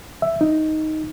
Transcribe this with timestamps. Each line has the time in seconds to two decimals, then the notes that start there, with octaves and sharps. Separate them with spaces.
0.22 E5
0.41 D#4